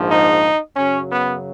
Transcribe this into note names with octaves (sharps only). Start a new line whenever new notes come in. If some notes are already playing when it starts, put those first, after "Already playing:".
Already playing: A#1 G#2 F3
D#4
F#2 C#3 F#3 C#4
B3